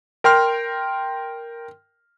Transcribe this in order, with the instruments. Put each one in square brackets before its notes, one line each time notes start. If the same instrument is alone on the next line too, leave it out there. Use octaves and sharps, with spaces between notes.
[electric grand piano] A#4 G5 C6 F6